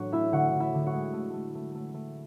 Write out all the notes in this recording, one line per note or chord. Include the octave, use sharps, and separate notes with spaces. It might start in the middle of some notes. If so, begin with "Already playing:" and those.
Already playing: A2 F#3 D4 F#4
A3 E4 E5
D3 F#4 F#5
D3
E4 E5
D3
F#4 F#5
G#3
A3
A3
A3
A3
A3